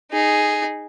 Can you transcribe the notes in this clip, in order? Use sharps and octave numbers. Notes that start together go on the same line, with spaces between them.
D#4 G#4